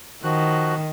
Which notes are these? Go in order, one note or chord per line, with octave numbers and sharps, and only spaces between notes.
D#3 F3 F#4 F#6